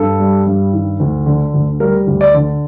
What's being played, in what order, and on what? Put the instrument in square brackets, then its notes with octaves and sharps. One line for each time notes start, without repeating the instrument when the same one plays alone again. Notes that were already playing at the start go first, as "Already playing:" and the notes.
Already playing: [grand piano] G2 A4
G3
G2
D#3
D2
D3
D2
G3 A#4
D2
D5
D3